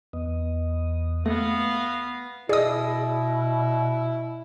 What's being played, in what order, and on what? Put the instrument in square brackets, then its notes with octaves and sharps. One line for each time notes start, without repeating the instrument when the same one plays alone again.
[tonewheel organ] E2 B3 D#5
[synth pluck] A3 [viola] B3 F5 [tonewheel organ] A#6
[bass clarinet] B2 [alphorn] E4 [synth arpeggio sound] G#4 D#6 [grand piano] D5 D#5